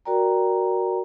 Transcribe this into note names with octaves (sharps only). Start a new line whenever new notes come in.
F#4 A#4 D5 G5 A#5